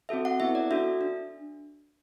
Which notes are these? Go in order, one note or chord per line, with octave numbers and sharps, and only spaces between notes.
C4 F#4 A4 E5
F#5
B3 E4 A4 E5
D5
D4 F#4 A4 E5
D4